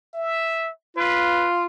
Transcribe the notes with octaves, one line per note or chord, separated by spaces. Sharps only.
E5
F4 B4